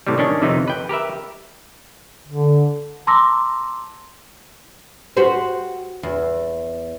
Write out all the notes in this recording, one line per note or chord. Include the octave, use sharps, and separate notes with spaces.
A2 C3 E3 G3
D#3 C#4 D4
F2 C3 D#3 E3 D#4
B4 G5
G4 A#4 B4 E5
D3
A5 A#5 C6 D6 E6 A#6
F#4 G4 C5
E2